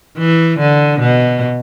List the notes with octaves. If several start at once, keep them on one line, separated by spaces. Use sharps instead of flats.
E3
D3
B2